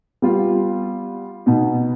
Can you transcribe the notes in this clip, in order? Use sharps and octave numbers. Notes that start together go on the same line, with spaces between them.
G3 B3 F4
B2 B3 D#4